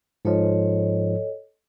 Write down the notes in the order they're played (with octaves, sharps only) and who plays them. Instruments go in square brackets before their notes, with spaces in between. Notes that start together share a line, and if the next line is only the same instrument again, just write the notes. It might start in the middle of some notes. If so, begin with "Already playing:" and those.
[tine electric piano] G#2 F3 [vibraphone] A4 C#5 D#5